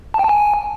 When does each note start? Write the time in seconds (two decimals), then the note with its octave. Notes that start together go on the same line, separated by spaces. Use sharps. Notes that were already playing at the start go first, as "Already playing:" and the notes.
0.14 A5
0.19 G5
0.24 A5
0.29 G#5